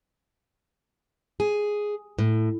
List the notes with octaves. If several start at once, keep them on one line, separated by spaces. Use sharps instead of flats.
G#4
A2